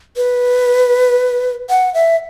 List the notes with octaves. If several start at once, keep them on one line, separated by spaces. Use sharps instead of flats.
B4
F#5
E5